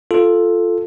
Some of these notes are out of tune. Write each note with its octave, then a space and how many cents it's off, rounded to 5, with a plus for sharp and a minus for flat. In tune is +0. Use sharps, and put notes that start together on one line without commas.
F4 +0 A4 +0